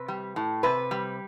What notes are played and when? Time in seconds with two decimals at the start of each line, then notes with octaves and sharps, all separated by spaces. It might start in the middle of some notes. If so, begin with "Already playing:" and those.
Already playing: C3 B4
0.08 G3
0.36 A2
0.63 C3 B4
0.91 G3